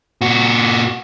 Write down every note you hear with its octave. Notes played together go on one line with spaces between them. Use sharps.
A#2 F#4